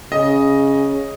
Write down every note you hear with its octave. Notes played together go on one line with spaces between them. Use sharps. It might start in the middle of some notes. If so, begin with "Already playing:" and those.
C#3 D#5